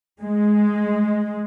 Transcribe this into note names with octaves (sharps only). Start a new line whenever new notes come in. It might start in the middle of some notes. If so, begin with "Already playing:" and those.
G#3